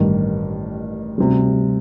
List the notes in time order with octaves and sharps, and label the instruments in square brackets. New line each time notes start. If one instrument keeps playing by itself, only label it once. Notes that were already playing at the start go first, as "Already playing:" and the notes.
Already playing: [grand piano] A1 G2 D#3
D2 C3 G3